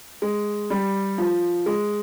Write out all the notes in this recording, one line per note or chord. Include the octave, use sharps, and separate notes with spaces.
G#3
G3
F3
G#3